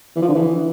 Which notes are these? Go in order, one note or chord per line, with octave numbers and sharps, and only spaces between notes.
E3
F3
D3
E3